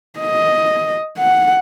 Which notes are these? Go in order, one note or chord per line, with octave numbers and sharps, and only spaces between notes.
D#5
F#5